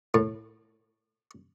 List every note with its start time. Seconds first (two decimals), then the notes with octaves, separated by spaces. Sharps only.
0.14 A2